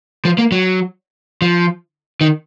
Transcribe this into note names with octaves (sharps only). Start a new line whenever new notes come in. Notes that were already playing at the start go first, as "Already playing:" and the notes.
F3
A#3
F#3
F3
D#3